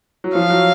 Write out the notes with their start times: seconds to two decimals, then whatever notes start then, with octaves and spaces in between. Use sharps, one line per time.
0.24 F#3
0.35 F3 F5
0.50 F#3